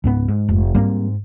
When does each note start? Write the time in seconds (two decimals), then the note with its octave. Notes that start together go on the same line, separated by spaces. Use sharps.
0.04 C#2 G#2 B3
0.28 G#2
0.49 F1
0.75 G#2 G3 A#3 C4